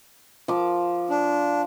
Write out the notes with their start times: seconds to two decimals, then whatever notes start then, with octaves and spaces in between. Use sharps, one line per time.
0.48 F3 D6
1.10 D4